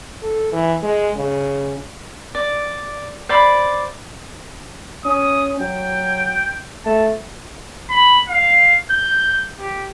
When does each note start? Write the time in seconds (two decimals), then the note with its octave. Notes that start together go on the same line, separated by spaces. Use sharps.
0.23 A4
0.52 E3
0.83 G#3
1.17 C#3
2.35 D5
3.29 C5 D5 B5
5.05 C#4 D#6
5.60 F#3 G5
6.86 A3 A5
7.90 B5
8.28 F5
8.91 G6
9.60 G4